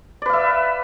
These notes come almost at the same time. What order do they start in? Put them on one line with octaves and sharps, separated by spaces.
D5 B4 F5 E5